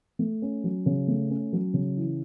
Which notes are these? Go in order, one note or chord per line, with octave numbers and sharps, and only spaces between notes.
A3
C#4
F#3
C#3
A3
C#4
F#3
C#3
E3